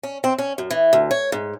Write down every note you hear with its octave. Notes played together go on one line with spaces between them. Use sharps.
C#4
C4
C#4
F#2
E3
D2
C#5
G#2